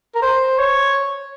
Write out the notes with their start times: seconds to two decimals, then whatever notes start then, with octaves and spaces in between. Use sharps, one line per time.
0.15 A#4
0.22 C5
0.58 C#5